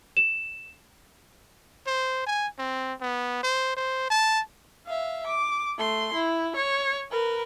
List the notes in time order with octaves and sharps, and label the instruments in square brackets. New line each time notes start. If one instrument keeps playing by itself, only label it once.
[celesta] E7
[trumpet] C5
G#5
C4
B3
C5
C5
A5
[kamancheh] E5 F5
D6
A3 C6
E4
C#5
A#4 B4